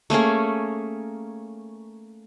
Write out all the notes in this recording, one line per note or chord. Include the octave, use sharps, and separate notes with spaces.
A3 A#3 C#4 G#4